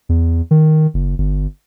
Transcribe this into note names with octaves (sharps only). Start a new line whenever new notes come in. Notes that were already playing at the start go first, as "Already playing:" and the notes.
E2
D#3
F#1
G1